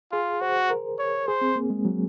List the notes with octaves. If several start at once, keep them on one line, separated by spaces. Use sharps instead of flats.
F4 G#4
F#4 C5
A#4
C#5
G#4 C5
C4
A#3
G#3
F#3